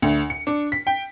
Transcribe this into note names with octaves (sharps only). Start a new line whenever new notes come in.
D2
C#7
D4
B6
G5